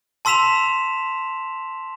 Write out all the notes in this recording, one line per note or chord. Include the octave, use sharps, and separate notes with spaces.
A5 C6 E6 B6 E7 F7